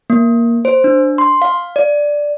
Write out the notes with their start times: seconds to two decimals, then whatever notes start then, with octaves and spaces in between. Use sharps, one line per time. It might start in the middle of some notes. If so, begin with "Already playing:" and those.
0.10 A#3
0.65 C5
0.84 D4
1.18 C6
1.42 F5
1.76 D5